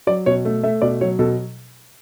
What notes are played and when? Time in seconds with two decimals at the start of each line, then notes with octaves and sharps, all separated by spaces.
0.07 F#3 D5
0.26 B2 C#5
0.45 A3
0.63 A3 E5
0.82 B2 D5
1.01 F#3 C#5
1.19 B2 A4